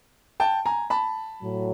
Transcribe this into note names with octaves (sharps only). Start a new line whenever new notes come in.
G5 A5
G#5 A#5
A5 B5
A2 F#3